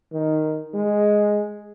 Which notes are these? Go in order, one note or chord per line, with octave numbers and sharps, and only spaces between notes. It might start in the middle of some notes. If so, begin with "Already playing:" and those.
D#3
G#3